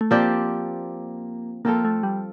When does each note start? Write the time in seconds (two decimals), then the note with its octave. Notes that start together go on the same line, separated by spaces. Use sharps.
0.01 A3
0.11 F3 A#3 C4 G4 D5
1.65 F3 A#3 C4 F4 A4
1.85 A3
2.03 G3